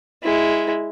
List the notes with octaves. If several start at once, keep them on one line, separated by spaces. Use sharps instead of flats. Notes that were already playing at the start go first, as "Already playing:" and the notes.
G#3 E4